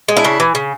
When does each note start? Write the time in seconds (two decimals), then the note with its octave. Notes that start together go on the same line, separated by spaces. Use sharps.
0.08 G#3
0.17 D4 E4
0.24 C#3
0.40 E3
0.55 C#3